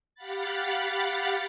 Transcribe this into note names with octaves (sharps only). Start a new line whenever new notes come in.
G4 F5 F#5 B5 A6